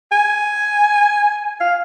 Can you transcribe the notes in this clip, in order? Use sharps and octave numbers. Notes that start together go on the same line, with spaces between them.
G#5
F5